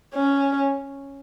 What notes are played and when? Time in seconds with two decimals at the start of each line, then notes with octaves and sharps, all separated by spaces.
0.15 C#4